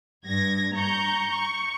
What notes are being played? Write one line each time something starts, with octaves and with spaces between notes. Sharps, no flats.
G2 G#6 A#6
A#5 C#6 G6
C#6